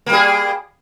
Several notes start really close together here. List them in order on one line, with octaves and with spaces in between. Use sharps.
A#3 G3 G#4